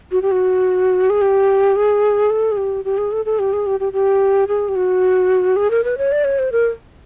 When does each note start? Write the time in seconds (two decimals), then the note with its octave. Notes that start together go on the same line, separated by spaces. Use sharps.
0.12 F#4
0.22 G4
0.32 F#4
1.10 G#4
1.22 G4
1.76 G#4
2.30 A4
2.52 G#4
2.57 G4
2.85 G4
2.98 G#4
3.12 A4
3.25 A4
3.39 G4
3.53 G#4
3.67 G4
3.80 G4
3.93 G4
4.48 G#4
4.69 G4
4.76 F#4
5.56 G#4
5.71 A#4
5.84 B4
5.98 C#5
6.12 D5
6.24 C#5
6.39 C5
6.52 A#4